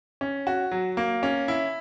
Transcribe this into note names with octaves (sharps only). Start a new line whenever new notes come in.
C#4
F#4
F#3
A#3
C#4
E4